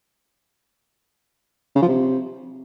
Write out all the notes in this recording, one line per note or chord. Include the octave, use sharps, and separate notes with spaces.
C#3
F3
C3